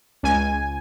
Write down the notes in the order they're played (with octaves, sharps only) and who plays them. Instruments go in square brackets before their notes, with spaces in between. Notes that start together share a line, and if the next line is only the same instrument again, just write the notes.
[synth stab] C#2 G#5